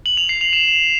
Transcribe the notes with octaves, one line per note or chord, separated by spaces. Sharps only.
F#7
F7
C7
F7
E7